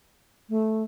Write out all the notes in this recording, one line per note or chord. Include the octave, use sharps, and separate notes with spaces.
A3